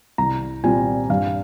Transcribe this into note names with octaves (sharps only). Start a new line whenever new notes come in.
C2 A#5
A#2 G3 C4 F4 G#5
G2 F5